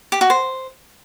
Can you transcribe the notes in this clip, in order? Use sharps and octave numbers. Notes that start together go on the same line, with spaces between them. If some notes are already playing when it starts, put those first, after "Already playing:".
G4
F#4
C5